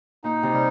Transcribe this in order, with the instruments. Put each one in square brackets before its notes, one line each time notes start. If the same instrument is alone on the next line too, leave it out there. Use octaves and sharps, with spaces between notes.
[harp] A#2 [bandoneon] D#4
[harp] C3
[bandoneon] G3